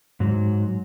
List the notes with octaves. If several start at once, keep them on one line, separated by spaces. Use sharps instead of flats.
G#2 F#3